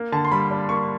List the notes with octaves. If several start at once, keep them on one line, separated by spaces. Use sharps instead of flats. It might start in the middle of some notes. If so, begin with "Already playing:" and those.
Already playing: A#3
D3 A5
C6
G3 B5
D4
A#3 C#6